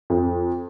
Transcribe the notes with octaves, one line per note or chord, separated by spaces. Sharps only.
F2